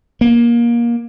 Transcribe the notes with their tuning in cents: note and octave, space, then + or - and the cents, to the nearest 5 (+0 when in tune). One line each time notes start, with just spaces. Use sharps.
A#3 +20